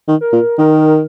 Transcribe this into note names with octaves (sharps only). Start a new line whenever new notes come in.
D#3
A#4
A#2
D#3 A#4